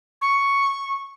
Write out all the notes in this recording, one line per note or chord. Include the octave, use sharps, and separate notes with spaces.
C#6